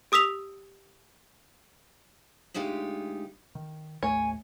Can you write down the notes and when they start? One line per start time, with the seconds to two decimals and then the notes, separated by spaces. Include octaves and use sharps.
0.12 G4 D#6 E6 B6 F7
2.54 D2 G#3 D#4 F4 G4
3.55 D#3
4.03 A1 D#2 A3 C#5 G#5